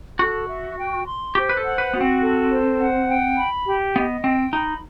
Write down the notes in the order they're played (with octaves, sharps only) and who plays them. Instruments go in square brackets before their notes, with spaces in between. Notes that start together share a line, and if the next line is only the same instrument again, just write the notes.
[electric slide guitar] F#4 [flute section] A4
[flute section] E5
G5
C6
[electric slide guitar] G4 [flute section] C5
[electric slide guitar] B4
A4
[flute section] F#5
[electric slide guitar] B4
[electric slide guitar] B3 [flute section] F#4
[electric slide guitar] C4
[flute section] A4
C5
F#5
G5
B5
G4
[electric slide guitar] B3 [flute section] D#5
[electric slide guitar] C4 [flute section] G5
[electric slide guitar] D#4 [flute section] B5